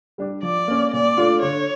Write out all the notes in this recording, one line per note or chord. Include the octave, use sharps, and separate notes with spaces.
G3 D4 G4
F3 D5
A#3 C#4
A#2 D5
A3 D4 F4
D3 C#5